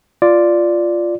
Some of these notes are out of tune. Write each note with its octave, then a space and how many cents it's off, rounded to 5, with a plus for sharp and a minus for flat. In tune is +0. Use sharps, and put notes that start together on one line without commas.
F4 -5 D5 +0